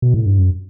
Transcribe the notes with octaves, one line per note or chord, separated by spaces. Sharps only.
B2
A2
G2
F#2